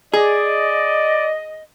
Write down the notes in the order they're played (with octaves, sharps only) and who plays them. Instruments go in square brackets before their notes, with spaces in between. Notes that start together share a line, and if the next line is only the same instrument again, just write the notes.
[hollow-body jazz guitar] G#4 [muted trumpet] D5 [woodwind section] D#5